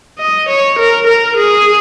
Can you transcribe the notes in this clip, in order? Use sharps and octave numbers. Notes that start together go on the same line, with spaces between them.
D#5
C#5
A#4
A#4
G#4